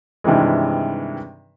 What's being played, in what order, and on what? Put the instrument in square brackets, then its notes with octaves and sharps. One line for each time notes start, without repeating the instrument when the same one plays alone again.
[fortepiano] G2 C3 D#3 E3 G#3